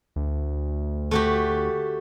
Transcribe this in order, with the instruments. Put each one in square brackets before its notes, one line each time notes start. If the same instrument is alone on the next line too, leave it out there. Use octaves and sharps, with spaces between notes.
[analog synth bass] D2
[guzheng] A3 F#4 G4